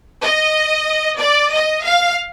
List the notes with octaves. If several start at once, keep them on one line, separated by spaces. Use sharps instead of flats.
D#5
D5
D#5
F5